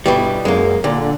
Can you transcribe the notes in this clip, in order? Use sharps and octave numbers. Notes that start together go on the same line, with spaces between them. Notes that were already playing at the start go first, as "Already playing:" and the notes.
G1 B2 E3 G3
F#2 G#3 A#3
A#2 D3